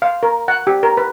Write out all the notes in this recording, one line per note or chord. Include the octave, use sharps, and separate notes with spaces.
F5
A#4
F#5
G4
A#4
B4